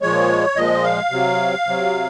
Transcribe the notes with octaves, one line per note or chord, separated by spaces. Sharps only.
A#2 F3 G#3 C#5
A#2 F3 G#3 D#5
F5
C3 F#3
C3 F#3